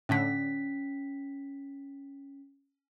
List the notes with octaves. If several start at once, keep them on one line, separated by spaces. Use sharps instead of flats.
A2 D3 C#4 B6